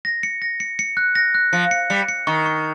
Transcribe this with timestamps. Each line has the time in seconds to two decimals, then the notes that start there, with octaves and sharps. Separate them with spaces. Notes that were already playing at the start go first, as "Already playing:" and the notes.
0.05 A#6
0.23 C#7
0.42 A#6
0.60 C#7
0.79 C#7
0.97 F#6
1.15 A#6
1.35 F#6
1.53 F3 C#7
1.71 C#7
1.90 G3 C#7
2.09 C#7
2.27 D#3 C#6
2.46 C#6